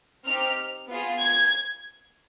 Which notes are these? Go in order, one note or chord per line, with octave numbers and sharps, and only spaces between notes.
C4 D#4 G4 F6
B3 F4 G#4
G#6